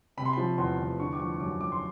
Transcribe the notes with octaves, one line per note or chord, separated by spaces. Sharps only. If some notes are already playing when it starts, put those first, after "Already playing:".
C3 B5
C6
F3 B5
E2 C6
E2
D3 C#6
D6
F3 C#6
C#6
F#2 D6
F#2 D6
C6